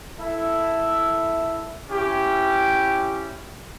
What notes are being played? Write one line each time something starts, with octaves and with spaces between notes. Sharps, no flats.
E4 A4 E5
C#4 E4 G4